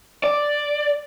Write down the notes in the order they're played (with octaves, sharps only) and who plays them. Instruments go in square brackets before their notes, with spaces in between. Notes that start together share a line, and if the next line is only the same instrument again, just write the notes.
[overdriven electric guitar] D5